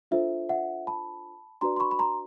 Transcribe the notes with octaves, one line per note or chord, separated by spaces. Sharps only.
D4 F4 A4 C5 E5
E5 F#5
A5 B5
D4 F#4 B4 D5 A#5 C6
C6
B5 C#6
B5
A#5 C6